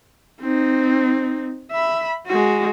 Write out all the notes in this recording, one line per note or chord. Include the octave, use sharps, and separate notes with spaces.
C4 D#4
E5 B5
G#3 F#4